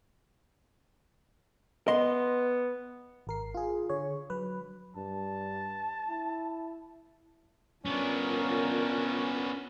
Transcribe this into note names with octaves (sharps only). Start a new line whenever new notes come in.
B3 D#5 C6
G#1 A#4 C7
F4 G#4
D3 G#4 C#5
F#3 B4
G2 A5
E4
B3 C#4 D4 F4 A#4